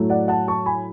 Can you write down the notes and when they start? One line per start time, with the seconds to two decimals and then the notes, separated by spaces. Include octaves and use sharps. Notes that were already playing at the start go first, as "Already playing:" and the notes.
Already playing: A2 F#3 A3
0.09 D5 F#5
0.28 F#5 A5
0.48 A5 C#6
0.66 G#5 B5